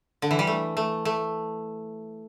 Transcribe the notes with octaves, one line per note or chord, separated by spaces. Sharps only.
D3
E3
G3
A3
A3
A3